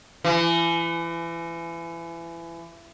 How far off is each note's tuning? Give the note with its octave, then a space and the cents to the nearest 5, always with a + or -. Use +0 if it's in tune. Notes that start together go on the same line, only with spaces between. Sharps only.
E3 +30